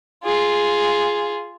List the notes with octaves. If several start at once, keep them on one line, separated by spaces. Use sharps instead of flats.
F4 G#4